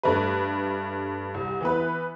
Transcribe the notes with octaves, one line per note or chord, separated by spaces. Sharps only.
G2 A3 B4
C2
E3 B3 B4